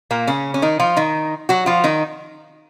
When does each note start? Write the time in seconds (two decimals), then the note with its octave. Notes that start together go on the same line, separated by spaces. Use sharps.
0.11 A#2 A#3
0.27 C#3 C#4
0.54 C#4
0.62 D#3 D#4
0.79 F3 F4
0.97 D#3 D#4
1.49 F#3 F#4
1.66 F3 F4
1.84 D#3 D#4